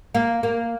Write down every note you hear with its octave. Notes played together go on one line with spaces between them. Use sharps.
A#3
A#3